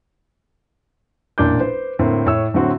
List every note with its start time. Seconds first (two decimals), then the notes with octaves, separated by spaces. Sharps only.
1.38 E1 A1 A#2 D4 D6 G6
1.60 B4 C5
1.99 A2 D3 A#3 C4
2.26 A2 C#5 E5 E6
2.54 A2 D3 F#3 C4 F#4